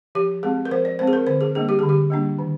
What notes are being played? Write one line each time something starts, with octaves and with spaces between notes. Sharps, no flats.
F3 G4
G#3 C4 G#4
A#4
F3 C5
D5
G#3 C4 C5
G#4
A#4
D3 C5
G#4
G3 A#3 D4 G#4
G4
D3 G#4
G4
G3 A#3 D4
D#3